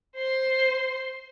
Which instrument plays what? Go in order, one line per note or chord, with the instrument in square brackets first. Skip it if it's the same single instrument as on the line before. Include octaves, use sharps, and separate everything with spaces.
[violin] C5 C6